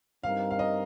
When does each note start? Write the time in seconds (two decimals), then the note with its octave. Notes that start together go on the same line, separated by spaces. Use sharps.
0.23 G2 G3 C4 D#4 A#4 F5
0.51 F5
0.59 D#5